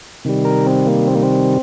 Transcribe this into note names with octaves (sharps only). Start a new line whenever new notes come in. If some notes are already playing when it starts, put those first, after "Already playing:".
C3 D#3 G3
A#4
C4
A#3
C4
A#3
C4